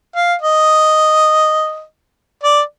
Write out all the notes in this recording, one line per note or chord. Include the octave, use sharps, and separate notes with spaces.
F5
D#5
D5